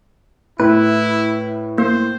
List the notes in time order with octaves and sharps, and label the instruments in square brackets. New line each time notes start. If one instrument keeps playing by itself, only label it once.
[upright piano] A2 [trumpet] E4 [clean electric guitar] B4
[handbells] A#3 [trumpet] C5